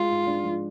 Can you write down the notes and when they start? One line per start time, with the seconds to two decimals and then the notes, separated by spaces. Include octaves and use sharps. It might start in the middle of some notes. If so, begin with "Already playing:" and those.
Already playing: G#3 F4
0.09 G#2
0.27 D4
0.44 F3